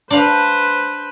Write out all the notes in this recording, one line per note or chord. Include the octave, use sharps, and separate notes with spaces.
D4 B4 C5 F5